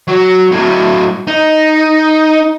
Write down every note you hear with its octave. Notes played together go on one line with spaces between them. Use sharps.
F#3
A2 F#3
D#4